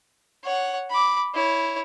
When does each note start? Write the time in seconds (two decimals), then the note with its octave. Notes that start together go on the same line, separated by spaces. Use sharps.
0.44 C#5 F#5
0.90 B5 D6
1.34 E4 C#5